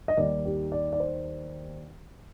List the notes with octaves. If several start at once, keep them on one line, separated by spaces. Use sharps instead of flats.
D#5
D#2 D#3 G3 D5
G4
D5
D5
C5